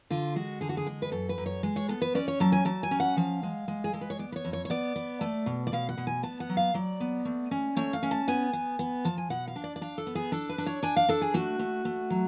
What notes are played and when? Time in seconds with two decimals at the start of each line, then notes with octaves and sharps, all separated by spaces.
0.10 D3 F4
0.36 G#3 F#4
0.61 D3 G#4
0.69 F#4
0.77 G#4
0.87 G#3
1.02 B4
1.12 F#2 A4
1.29 B4
1.38 F#2
1.46 C#5
1.63 G#3
1.76 C#5
1.88 B3 A4
2.02 B4
2.15 C#4 D5
2.28 C#5
2.40 F#3 A5
2.52 G#5
2.65 F#3 A5
2.83 G#5
2.91 C#4
3.00 F#5
3.17 F3 F5
3.43 G#3
3.68 G#3
3.84 G#4
3.93 G#3 A4
4.01 B4
4.10 C#5
4.19 B3 D5
4.32 B4
4.36 C#5
4.45 F2
4.53 C#5
4.65 C#5
4.70 B3 D5
4.96 B3
5.21 A3
5.46 B2
5.67 D5
5.73 B2 F5
5.89 F#5
5.98 B2
6.07 G#5
6.23 B3 A5
6.40 F#5
6.49 F#3
6.57 F5
6.74 F#3 D5
7.00 B3
7.25 A3
7.51 C#4
7.76 A3 C#5
7.93 F5
8.03 C#4
8.11 A5
8.28 B3 G#5
8.53 B3
8.79 B3
9.05 F3 A5
9.18 G#5
9.30 B2 F#5
9.48 F5
9.56 D4
9.64 D5
9.76 D5
9.81 D4 F5
9.98 A4
10.07 B3
10.15 G#4
10.32 D4 A4
10.49 B4
10.58 D4
10.66 C#5
10.83 D4 G#5
10.96 F5
11.08 D4 A4
11.21 G#4
11.34 A3 F#4
11.59 A3
11.85 A3
12.10 F#3